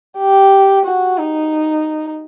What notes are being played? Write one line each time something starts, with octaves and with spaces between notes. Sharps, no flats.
G4
F#4
D#4